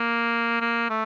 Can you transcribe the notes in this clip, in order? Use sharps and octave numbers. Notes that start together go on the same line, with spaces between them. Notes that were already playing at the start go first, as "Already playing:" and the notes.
Already playing: A#3
A#3
A3